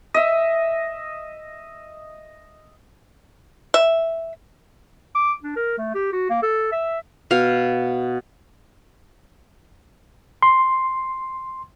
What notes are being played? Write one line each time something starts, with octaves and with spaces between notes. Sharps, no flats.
D#5 E5
E5
D6
D4
A#4
A3
G4
F#4
A#3
A4
E5
B2 F5
C6